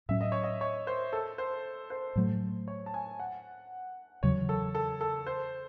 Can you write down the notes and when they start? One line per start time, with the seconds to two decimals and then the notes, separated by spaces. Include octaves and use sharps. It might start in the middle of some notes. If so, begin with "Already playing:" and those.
0.09 A2 F#3 C#4 E5
0.21 D#5
0.32 C#5
0.44 D#5
0.61 C#5
0.87 C5
1.13 A4
1.38 C5
1.90 C5
2.16 A2 F#3 A3
2.68 C#5
2.86 A5
2.94 G#5
3.20 F#5
4.23 E2 C#3 F#3 C#5
4.49 A4
4.75 A4
5.01 A4
5.27 C5